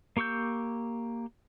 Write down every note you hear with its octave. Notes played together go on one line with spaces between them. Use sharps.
A#3 G4 C#6 E6 G6